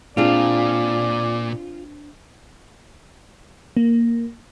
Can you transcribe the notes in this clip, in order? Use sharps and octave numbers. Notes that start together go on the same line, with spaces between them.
A#2 C4 D4 F4 G#4 D5
A#3